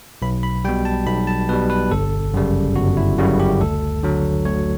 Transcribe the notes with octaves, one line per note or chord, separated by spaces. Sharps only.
B1 B5
B5
B2 G3 G5
A5
B1 B5
A5
B2 G3 B4
B4
G1 A4
F#2 C#3 G3
G1 F#4
E4
F#2 C#3 G3 F#4
G4
D2 A4
D3 F#3
D2 C#5